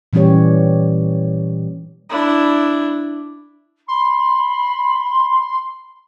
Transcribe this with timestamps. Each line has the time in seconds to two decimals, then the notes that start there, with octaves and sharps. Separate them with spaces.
0.13 A#2 E3 G3 C#4 G4 C#5
2.10 D4 E4
3.88 B5 C6